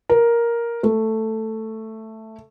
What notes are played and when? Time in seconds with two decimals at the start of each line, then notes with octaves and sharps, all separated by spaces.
0.09 A#4
0.83 A3